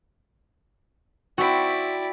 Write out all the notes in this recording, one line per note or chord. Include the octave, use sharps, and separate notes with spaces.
C4 E4 F#4 D5 B5